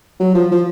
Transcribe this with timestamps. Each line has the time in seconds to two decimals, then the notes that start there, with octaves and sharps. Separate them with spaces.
0.20 F#3
0.35 F3
0.51 F3